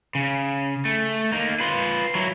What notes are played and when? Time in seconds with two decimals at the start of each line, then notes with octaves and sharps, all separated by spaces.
0.15 C#3
0.85 A3
1.32 A#3 D#4
1.60 F4 B4
2.15 F#3 E4